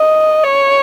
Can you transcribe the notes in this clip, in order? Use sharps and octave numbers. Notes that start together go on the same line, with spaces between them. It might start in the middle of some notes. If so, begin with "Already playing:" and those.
Already playing: D#5
C#5